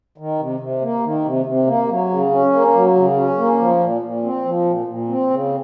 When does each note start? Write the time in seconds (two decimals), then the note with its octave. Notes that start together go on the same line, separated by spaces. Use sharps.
0.18 D#3
0.39 C3
0.60 C3
0.81 A#3
1.04 D#3
1.25 C3
1.46 C3
1.67 A#3
1.89 F#3
2.10 C#3
2.31 C#4
2.53 A#3
2.74 F#3
2.96 C#3
3.16 C#4
3.38 A#3
3.59 F3
3.80 A#2
4.02 A#2
4.23 C4
4.45 F3
4.65 A#2
4.87 A#2
5.08 C4
5.30 C#3